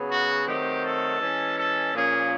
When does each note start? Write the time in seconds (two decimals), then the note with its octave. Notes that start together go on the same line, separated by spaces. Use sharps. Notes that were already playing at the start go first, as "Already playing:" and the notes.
Already playing: C#3 F#3 B3
0.10 F#4
0.46 D#3 F#3 A3 C4 G4
0.83 A4
1.20 E3 G#3 C#4
1.57 A4
1.93 A#2 F3 A#3 C#4 G#4